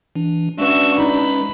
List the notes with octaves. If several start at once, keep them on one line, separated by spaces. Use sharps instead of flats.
E3 D4
G#3 C#4 D4 F#4 B4 E5
D#4 B5